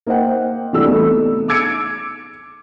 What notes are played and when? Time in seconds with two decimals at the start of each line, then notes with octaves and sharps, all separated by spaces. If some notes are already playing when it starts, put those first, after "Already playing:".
0.07 A#3 D#4 C5 D#5 F#5 G5
0.73 C3 E3 G3 A3 D4 E6
0.86 A3 B3 D#4
1.48 D6 E6 G#6 C#7 D7